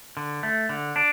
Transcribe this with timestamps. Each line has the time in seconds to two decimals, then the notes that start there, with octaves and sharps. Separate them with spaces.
0.17 D3
0.43 A3
0.69 D3
0.96 D4